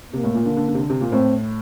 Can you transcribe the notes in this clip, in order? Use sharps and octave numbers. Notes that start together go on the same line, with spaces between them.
C3 A#3
A2
A#2
D3
D3
D3
C3
D3
C3
A#2
A2 C4